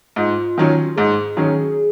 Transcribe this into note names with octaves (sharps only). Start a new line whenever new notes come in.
G#2 F4
D#3 F#3 C#4
G#2 G#4
D#3 F#3 C#4